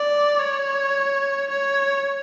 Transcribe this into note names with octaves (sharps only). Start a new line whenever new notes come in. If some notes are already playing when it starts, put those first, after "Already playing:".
Already playing: D5
C#5
C#5